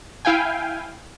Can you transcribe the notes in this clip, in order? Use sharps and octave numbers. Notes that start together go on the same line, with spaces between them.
E4 F5 G5 G#5